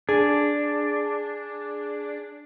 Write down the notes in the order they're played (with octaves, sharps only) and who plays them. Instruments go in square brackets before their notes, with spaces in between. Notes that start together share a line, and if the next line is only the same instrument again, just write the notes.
[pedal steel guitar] D4 [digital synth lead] G#4